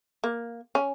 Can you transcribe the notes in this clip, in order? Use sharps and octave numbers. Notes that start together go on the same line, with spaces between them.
A#3
C#4